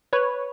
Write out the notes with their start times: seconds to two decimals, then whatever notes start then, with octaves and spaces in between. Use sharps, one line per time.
0.13 B4 C#5